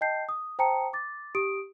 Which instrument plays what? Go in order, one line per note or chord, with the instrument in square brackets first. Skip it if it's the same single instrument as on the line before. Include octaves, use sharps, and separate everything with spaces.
[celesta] D#5 G5 A5 G6 C7
D#6
C5 G5 A5 A#5 D#6 C#7
D6 A6
G4 D#6 D7